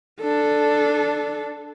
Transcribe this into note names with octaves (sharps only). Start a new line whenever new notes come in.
D4 A4